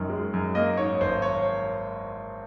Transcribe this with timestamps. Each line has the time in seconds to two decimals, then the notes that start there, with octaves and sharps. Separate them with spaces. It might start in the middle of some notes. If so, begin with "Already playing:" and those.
Already playing: F#2 D#3
0.10 G#3
0.33 F#2
0.55 A#3 D#5
0.77 G#2 C#5
1.01 G#1 C5
1.22 C#5